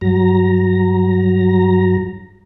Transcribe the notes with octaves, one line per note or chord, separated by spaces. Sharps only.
G2 F#3 A#5